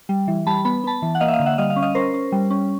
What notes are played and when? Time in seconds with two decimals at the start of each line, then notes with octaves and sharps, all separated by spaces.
0.09 G3
0.28 E3
0.47 G3 A5 B5
0.65 B3 B5
0.84 B3 A5 B5
1.02 E3
1.15 F#5
1.20 A#3 D#5 F5
1.28 E5
1.33 D#5 F5
1.39 D3
1.46 E5 F#5
1.58 G3 D#5 F5
1.70 D#5 F5
1.76 C#4
1.82 D#5 F5
1.95 C#4 A#4 C5
2.14 C#4
2.32 G3
2.50 C#4